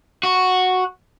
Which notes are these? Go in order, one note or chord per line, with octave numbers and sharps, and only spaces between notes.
F#4